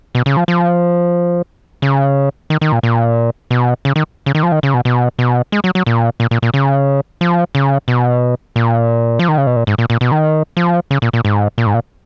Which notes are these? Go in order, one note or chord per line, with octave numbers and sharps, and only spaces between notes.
B2
C#3
F3
F3
C#3
D#3
D#3
A#2
A#2
B2
C#3
D#3
C#3
D#3
F3
D#3
C#3
B2
B2
B2
G#3
F#3
F#3
A#2
A#2
A#2
A#2
C#3
F3
C#3
B2
A#2
F3
D#3
C#3
B2
A#2
G#2
A#2
A#2
B2
D#3
F3
C#3
A#2
A#2
G#2
A#2
G#2
A#2